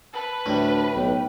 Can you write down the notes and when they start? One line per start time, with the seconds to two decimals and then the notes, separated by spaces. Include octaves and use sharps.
0.14 B4 A5
0.46 D2 A2 C3 G3
0.95 B1 G5